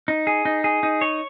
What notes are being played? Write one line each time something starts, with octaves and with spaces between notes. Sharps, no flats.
D#4
G#4
D#4
G#4
D#4
C#5